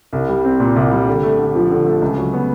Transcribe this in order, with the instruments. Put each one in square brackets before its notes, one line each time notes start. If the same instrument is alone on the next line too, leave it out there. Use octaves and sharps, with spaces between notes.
[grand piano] C2
G3
C4
A#2
C2
G3
D3
A3
D3
F3
D3
A3
C#2
F#3
B3